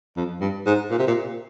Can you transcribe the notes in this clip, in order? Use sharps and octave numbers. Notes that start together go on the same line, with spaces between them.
F2
G2
G#2
A#2
C3
A#2